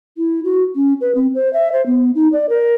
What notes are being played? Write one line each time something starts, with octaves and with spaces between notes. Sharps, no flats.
E4
F#4
C#4
B4
C4
C5
E5
C5
B3
D#4
D5
A#4